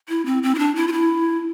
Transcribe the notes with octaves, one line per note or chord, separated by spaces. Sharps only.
E4
C4
C4
E4
D4
E4
F4
E4